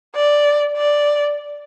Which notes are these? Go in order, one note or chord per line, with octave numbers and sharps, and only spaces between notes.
D5
D5